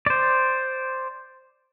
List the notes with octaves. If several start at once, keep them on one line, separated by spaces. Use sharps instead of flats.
C5 D5